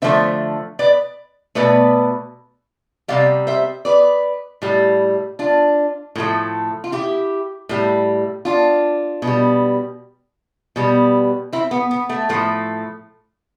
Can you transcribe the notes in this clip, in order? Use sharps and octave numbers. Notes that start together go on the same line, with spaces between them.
D3 F3 A3 C5 E5
B4 D5
B2 A3 B4 D5
C3 G3 D5 F5
C5 E5
B4 D5
A2 G3
D4 F4
A2 F3 A3
F4
E4 G4
A2 G3
D4 F4
B2
G3
B2 G3
C4 E4
B3
B3
A3
A2 F3 A3